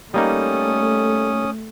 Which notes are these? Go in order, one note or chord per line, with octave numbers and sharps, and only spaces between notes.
G3 A3 A#3 C#4 D#4 D#6